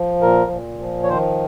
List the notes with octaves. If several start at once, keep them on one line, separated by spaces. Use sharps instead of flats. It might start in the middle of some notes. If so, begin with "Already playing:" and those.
Already playing: F3
A#2 A#4
A#2
F3
C#5
D#3 C5